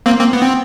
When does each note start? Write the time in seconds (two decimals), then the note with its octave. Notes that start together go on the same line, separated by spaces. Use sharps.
0.06 A#3 C4
0.19 A#3 C4
0.33 B3
0.43 C4